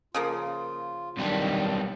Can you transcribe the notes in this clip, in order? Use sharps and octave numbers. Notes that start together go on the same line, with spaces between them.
C#3 F3 A#3 F4
B1 D#3 G3 D4